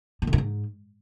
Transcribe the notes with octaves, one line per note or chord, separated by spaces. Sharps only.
A2
C#3
F#2
G#2